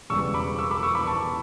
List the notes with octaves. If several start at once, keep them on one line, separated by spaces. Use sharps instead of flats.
E1 E2 C#3 G3 C#6 E6
B5 D6
C#6 E6
B5 D6
C#6 E6
B5 D6
A5 C#6